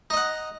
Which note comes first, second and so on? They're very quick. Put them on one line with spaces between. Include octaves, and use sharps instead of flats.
D#4 D#5 F#5